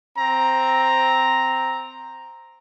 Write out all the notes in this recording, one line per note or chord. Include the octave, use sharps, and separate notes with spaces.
C4 A#5